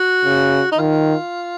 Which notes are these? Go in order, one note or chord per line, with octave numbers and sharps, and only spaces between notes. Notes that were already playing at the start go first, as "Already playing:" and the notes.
Already playing: F#4
C#3
D#4
D#3 F4